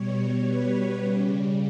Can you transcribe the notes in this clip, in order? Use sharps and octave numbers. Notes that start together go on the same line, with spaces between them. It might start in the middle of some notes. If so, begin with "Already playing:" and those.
Already playing: B2 G3 C#5
B4
C#3 G3